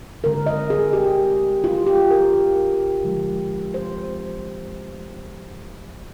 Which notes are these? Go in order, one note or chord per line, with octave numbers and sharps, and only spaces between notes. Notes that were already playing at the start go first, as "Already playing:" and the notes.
D3 G#3 C4 A#4
D#5
G#4
G4
F4
G4
A#4
D3 F3 G#3
C5